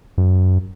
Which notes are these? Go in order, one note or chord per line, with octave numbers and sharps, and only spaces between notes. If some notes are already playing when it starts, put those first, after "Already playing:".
F#2